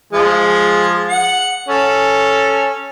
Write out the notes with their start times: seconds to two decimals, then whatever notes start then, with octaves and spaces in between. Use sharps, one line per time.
0.13 F3 G#3
1.08 F#5
1.69 C#4 A4